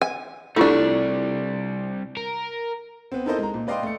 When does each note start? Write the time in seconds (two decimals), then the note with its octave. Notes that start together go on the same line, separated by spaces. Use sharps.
0.01 G#5
0.56 C3 G3 A3 D4 E4 F4 G4
2.17 A#4
3.12 B3 C4
3.26 D#4 E4 A4 A#4 C5 D#5
3.39 G#3 A#5
3.54 A#2
3.67 B4 D5 D#5 F5 G5 C6
3.83 A3 C#7